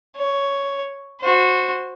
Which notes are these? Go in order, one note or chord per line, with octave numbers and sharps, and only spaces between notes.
C#5
F#4 C5